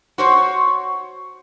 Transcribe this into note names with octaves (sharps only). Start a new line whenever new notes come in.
F#4 C5 C#5